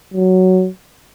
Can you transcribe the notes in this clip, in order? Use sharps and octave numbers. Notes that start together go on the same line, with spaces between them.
F#3